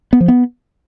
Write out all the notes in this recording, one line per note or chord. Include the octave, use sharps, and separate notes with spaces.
B3
F3
B3